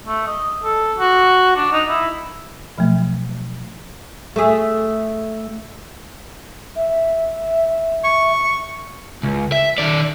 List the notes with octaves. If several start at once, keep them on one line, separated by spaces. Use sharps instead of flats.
A3
D#5
A4
F#4
D4
D#4
E4
B2 F3 F#3 A3
A3 G#4
E5
C#6
C#2
E5
D#3 D5